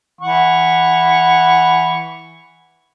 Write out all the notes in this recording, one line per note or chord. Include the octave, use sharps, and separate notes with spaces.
E3 F#5 C#6